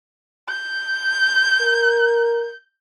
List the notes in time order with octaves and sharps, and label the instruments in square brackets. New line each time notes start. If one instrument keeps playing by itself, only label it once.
[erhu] G6
[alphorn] A#4